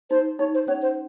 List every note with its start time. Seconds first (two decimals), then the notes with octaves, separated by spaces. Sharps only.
0.10 D#4 C5
0.39 D#4 C#5
0.54 C5
0.68 C#4 C#5
0.82 C5